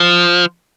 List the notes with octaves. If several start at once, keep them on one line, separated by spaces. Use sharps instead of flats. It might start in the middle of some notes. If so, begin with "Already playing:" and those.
Already playing: F3